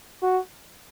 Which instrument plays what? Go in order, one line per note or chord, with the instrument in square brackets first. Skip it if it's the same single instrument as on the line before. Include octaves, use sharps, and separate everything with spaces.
[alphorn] F#4